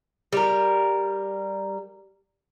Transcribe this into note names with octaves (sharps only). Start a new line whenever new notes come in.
G3 A#4